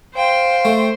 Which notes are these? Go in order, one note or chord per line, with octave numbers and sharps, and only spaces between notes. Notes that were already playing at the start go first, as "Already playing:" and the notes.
C5 F5 G5
A3